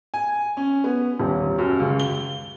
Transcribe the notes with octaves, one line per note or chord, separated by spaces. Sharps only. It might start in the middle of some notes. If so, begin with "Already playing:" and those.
G#5
C#4
B3
D#1
F#2
C#2
G7